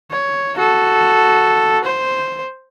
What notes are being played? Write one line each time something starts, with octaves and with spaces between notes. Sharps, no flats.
C#5
F#4 A4
C5